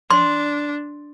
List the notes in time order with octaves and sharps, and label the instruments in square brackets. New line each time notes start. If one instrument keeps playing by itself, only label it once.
[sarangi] D4 [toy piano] C6